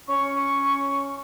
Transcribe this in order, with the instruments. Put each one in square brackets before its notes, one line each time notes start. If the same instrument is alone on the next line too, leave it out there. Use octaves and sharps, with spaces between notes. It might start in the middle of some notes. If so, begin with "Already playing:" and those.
[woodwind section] C#4 C#6